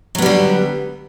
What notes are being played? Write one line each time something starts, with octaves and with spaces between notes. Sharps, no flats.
D3 F#3 G3 B3